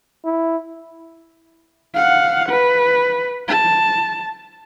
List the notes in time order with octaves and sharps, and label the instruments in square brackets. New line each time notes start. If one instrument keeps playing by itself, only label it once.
[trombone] E4
[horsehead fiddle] F5 F#5
B4
A5